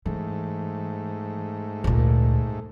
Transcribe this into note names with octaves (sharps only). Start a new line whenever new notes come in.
G#2 E3 A3
D2 A#2